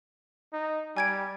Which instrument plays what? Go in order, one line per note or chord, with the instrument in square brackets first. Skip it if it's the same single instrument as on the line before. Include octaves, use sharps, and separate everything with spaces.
[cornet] D#4
[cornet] G3 [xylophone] G#5 G#6 D7